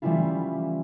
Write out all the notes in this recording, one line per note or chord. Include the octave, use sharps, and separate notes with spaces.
E3 G3 A3 C#4 E4 F4